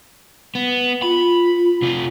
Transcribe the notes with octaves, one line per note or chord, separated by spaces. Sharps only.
B3
F4 B5
C3 F4